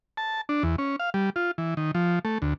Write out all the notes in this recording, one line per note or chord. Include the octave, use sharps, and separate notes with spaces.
A5
D4
E2
C#4
F5
G3
F4
E3
D#3
F3
A3
D2